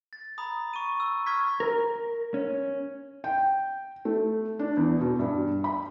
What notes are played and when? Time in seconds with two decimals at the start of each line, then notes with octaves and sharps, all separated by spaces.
0.13 A6
0.38 A#5 B5 D#6
0.73 C#6 D#7
1.00 E6
1.26 C#6 F6 G#6 B6
1.60 A#4
2.34 C#4
3.24 G5
4.05 A3
4.59 D4
4.77 E2
5.00 B2
5.19 G2
5.64 B5